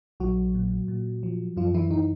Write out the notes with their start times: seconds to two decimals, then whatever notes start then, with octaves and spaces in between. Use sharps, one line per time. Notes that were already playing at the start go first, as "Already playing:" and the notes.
0.20 A#1 F#3 F#4
0.55 A#2
0.88 A#2
1.23 F3
1.57 F#2 F3 F4
1.74 E3 E4
1.91 E3 D#4